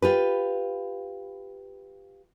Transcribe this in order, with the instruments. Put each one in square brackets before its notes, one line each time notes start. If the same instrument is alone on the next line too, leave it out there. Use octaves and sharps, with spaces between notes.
[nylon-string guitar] F4 G4 B4